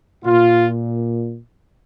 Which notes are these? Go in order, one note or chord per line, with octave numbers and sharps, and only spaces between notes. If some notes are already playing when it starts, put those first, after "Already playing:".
A#2 F4